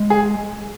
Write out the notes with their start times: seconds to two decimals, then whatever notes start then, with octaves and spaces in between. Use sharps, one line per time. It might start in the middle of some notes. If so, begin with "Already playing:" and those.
Already playing: G#3
0.10 G#4